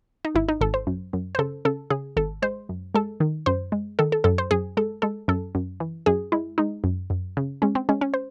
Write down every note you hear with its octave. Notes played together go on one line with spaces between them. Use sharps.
D#4
G#1 E4
D#4
G#1 A4
C5
F#2
F#2
C5
C#3 A4
C#3 A4
C#3 G#4
G#1 A4
G#3 C5
F#2
G#3 A4
D#3
F#2 C5
G#3
D#3 A4
A4
F#2 A4
C5
F#2 G#4
G#3 A4
G#3 A4
F#2 A4
F#2
E3
F#2 G#4
G#3 E4
G#3 D#4
F#2
F#2
C#3
G#3 C#4
C4
G#3 C#4
C#4
C5